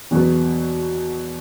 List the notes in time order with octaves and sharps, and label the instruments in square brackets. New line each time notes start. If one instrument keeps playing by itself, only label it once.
[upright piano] E2 B2 F#3 B3